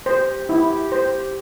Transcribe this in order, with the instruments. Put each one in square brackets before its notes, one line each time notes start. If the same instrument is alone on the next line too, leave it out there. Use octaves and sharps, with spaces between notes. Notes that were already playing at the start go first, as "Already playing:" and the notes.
[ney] G4 [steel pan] C5
[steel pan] E4
C5